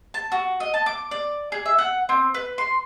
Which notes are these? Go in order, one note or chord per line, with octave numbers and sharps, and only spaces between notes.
A5
F#4
D#5
A5
D6
D5
G#4
E5
F#5
C4
B4
C6